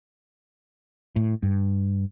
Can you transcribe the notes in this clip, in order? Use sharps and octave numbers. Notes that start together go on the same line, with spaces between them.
A2
G2